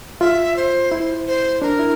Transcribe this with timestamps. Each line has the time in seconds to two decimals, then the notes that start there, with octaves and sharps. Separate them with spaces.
0.20 F4 E5
0.56 C5
0.92 E4
1.27 C5
1.62 D4 A#4
1.79 E4